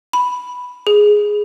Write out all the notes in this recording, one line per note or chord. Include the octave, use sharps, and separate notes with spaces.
B5
G#4